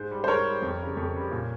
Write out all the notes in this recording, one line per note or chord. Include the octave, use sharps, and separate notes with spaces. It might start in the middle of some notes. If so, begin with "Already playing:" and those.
Already playing: G#2 C5
G3
C5
G#2 A#4 C#5
G3
F2
C#3 G3
F2
C#3 G3
A#2